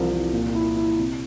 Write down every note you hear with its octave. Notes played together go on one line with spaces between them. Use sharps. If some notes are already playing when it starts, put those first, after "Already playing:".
Already playing: C2 E3 F3
C2
A#2
E4
E4
C3